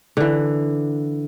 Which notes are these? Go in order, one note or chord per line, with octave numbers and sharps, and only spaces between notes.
D3 E3